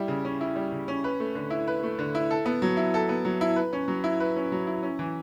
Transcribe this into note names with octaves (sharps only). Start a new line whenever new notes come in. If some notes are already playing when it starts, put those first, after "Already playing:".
Already playing: G3 E4
C#3
C#4
E4
G3
C#3
C#4
B4
A3
D3
E4
B4
A3
D3
E4
A4
B3
F#3
E4
A4
B3
F#3
E4
B4
C#4
F#3
E4
B4
C#4
F#3
E4
C#4
E3